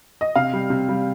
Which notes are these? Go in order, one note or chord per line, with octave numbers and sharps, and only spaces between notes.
D#5
C3 F5
G3
C3
G3